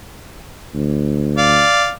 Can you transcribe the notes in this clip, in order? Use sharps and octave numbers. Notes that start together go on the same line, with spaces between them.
D2
D5 F5